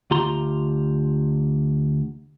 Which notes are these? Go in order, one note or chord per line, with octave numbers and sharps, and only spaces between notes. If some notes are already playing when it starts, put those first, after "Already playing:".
D2 F4 G4 A#5 C6